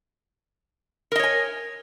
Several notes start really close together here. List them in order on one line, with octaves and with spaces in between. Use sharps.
A#4 D#5 C#5 G#5